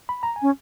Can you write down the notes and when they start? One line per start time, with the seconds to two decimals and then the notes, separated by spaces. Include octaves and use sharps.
0.09 B5
0.23 A#5
0.36 G#5
0.42 C#4